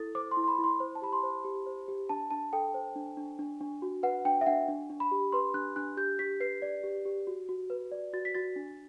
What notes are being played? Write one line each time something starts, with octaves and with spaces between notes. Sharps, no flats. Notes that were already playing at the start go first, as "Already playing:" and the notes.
Already playing: E4 A4 A6
C5 D6
C6
E4
C6
B5
E4
C6
C5
A5
G4 B5
C6
C5
G4
C5
G4
D4 A5
D4 A5
A4 G5
C5
D4
D4
D4
D4
F#4
B4 F#5
D4 G5
E5
D4 F#5
D4
D4
B5
G4
B4 C6
D4 F#6
D4 F#6
G4 G6
G4 B6
B4 C7
D5
G4
G4
F#4
F#4
B4
D5
F#4 A6
B6
F#4 A6
D4